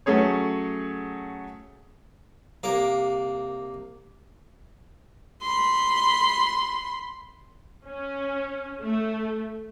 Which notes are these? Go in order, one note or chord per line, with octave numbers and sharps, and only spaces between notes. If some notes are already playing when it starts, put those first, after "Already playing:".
F#3 A3 C#4 G#4 C#5
C2 A#3 D6
B5 C6
C#4
A3